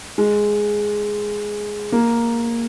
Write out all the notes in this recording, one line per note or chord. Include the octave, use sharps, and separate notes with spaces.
G#3
A#3